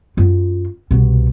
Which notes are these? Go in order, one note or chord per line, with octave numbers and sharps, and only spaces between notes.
F#2 F4
C2 B2